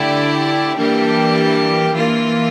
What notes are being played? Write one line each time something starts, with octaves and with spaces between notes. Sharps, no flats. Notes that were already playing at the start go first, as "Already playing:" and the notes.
Already playing: D3 A3 E4 G4 D5
E3 G3 A#3 D4 G4
E3 A#3 F4